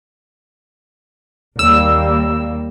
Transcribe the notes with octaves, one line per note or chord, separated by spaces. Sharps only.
D#2 G3 A#3 E6